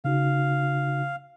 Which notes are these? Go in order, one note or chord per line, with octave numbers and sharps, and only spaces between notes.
C#3 D#4 F#4 F5